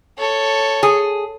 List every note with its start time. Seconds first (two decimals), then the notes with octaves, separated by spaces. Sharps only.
0.18 A4 C#5
0.83 G#4